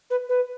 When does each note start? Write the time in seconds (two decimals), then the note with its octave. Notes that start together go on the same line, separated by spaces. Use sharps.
0.10 B4
0.29 B4